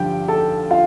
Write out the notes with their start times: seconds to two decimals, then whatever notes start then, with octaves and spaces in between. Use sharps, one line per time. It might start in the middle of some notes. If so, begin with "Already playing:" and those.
Already playing: G2 D3 F3 G4 G5
0.28 A4 A5
0.70 F4 F5